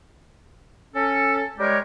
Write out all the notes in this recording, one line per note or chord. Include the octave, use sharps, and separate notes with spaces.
C#4 A4
G3 G#3 G4 A#4 C#5